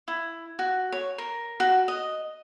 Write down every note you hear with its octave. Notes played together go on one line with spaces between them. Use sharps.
E4
F#4
C#5
A#4
F#4
D#5